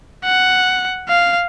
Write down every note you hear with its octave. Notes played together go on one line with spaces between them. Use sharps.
F#5
F5